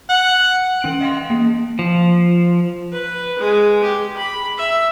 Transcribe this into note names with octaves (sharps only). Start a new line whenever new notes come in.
F#5
E3 C#4 G5 D7 F#7
D#5 F5 G5 C6
A#3
F3
B4
G#3
G4
B5
E5